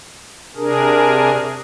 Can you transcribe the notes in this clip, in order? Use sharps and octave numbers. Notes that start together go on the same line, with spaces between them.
C3 D4 G#4 A#4